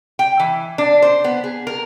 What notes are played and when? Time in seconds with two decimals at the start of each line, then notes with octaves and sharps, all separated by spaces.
0.19 G5
0.40 E3
0.78 D4
1.02 C5
1.24 B3
1.44 G#4
1.67 A#4